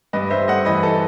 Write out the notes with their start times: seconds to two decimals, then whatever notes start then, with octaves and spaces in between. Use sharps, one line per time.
0.13 G2 B4 D#5
0.30 G2 C5 E5
0.48 A3 D#5 F#5
0.65 E3 B4 D#5
0.83 A4